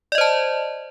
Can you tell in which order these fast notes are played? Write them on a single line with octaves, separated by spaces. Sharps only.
D5 D#5 C5 A5